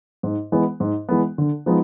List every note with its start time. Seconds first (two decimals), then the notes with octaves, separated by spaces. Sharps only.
0.23 G#2
0.52 E3 G#3 B3
0.80 G#2
1.09 E3 G#3 B3
1.38 D3
1.66 F3 G#3 B3 D#4